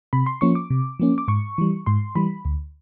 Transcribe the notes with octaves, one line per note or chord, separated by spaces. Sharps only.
C3 B5
C6
F3 A#3 C#4 C#6
D6
C3
F3 A#3 C#4
D6
G#2 C#6
E3 G3
G#2 C6
E3 G3 B5
D2